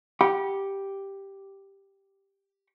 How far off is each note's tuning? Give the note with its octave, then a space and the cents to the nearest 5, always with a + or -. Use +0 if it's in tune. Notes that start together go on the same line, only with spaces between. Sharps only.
G4 +0 F#5 +0 B5 -30